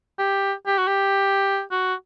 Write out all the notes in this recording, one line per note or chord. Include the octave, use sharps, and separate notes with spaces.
G4
G4
F#4
G4
F#4